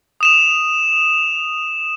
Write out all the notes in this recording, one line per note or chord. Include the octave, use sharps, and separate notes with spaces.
D#6 E7 F7